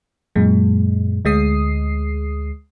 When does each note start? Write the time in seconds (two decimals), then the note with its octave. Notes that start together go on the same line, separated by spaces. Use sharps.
0.36 F#2 A#2 G#3
1.25 D2 G#3 D#6 C7